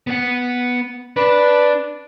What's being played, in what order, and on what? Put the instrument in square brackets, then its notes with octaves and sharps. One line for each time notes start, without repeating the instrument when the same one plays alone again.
[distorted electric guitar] B3 F#5
[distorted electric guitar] D4 [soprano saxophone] B4